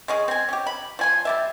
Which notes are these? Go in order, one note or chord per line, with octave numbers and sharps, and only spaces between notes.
G#3 C#4 G#4
C4 G#5
C#4 G4
B5
F3 G#5 C6
G3 D5 E5